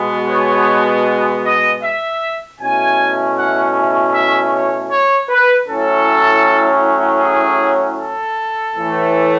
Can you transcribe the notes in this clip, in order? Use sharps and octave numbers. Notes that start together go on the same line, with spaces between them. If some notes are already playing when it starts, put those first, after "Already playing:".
Already playing: B2 G#3 B3
C#5
D#5
E5
B2 A3 C#4 E4 G#5
F#5
E5
C#5
C#5
B4
A2 F#3 C#4 E4 A4
G#4
A4
A2 E3 A3